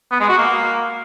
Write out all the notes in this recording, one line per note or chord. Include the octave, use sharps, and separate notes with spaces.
B3
G#3
F#4
A#3